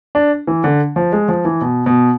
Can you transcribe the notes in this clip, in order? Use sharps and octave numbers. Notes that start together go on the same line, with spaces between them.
D4
E3
D3
F3
G#3
F3
E3
B2
B2